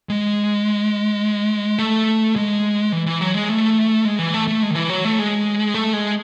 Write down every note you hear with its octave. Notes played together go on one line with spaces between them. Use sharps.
G#3
A3
G#3
E3
E3
F#3
G#3
A3
G#3
E3
A3
A3
G#3
D#3
E3
F#3
A3
G#3
A3
G#3